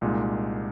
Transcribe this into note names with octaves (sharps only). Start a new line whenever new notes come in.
C2 A#2 G#3 D#4